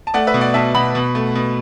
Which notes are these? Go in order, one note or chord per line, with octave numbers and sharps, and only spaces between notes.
A5
A3 D5 F#5
B4 E5
B2
D5 F#5
B2 E5 A5
B2 F#5 B5
B2
A3
B2